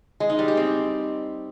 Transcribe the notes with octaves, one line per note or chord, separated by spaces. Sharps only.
G#3
D#4
G3
G4
C4